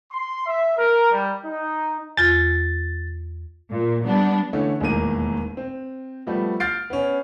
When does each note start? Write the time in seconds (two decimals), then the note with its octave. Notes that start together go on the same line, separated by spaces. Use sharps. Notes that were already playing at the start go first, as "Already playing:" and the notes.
0.13 C6
0.46 E5
0.78 A#4
1.12 G3
1.46 D#4
2.17 E2 F4 A6
3.71 A#2
4.06 G3 B3 D4
4.53 D3 E3 A3 C#4
4.80 E1 D#2 A2 D#3 A#3 D#7
5.57 C4
6.27 F3 G3 A3 B3
6.60 F6 G6 A6 C7 D7
6.90 B3 C#4